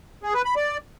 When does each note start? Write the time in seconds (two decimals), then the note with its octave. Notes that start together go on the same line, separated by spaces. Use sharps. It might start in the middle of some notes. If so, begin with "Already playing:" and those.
0.23 G#4
0.34 B4
0.45 B5
0.56 D5